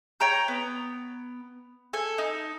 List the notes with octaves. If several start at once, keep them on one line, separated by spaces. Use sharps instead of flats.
C#5 G5 A#5 G6
B3
A4 G#5
D#4